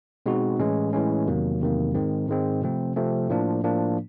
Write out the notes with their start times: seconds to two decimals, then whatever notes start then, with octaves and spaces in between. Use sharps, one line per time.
0.26 B2 G#3 C4 D#4 F#4
0.59 A2 E3 G#3 C#4
0.93 A2 E3 G#3 C#4
1.27 E2 C3 D#3 F#3 A#3
1.61 E2 C3 D#3 F#3 A#3
1.94 G#2 D#3 G#3 C4
2.28 G#2 D#3 G#3 C4
2.62 C3 F3 A3 C4
2.96 C3 F3 A3 C4
3.30 A2 F3 A#3 D4
3.63 A2 F3 A#3 D4